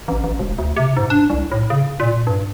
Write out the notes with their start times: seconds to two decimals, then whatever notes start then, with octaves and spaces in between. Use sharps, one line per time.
0.08 A1
0.24 A1
0.39 E1
0.58 D2
0.76 C3
0.97 G#2
1.10 D4
1.30 C2
1.52 A2
1.70 C#3
2.00 A#2
2.27 G2